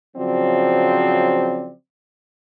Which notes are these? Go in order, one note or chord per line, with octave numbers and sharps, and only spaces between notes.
C#3 F3 F#3 C4 D5